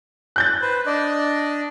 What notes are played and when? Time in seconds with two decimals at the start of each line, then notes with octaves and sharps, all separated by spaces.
0.36 F#6 G6 A6
0.62 B4 C5
0.86 D4 D5 D#5